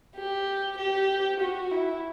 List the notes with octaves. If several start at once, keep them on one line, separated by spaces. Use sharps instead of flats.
G4
G4
F#4
E4